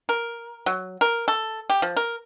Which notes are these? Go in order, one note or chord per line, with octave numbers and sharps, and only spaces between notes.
A#4
F#3
A#4
A4
G4
F3
A#4